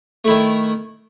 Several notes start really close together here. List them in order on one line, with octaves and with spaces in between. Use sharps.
A3 E4 D#3